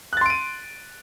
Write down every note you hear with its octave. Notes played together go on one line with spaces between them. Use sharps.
C6 F#6 A6 D7 D#7